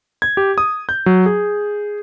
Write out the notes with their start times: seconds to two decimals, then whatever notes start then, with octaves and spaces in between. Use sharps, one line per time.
0.22 G#6
0.37 G4
0.58 D#6
0.89 G6
1.06 F#3
1.26 G#4